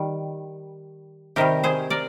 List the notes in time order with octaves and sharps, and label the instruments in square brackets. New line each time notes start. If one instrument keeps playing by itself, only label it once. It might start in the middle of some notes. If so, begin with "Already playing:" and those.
Already playing: [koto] D#3 G3
C3 D#3 G3 G4 A#4
G#4 C5
A#4 D5